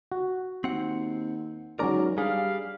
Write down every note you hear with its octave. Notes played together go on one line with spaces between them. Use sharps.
F#4
D#2 C4 F#5
G#2 F#3 C#4 A#4 D5 A#5
G2 G3 G#4 F5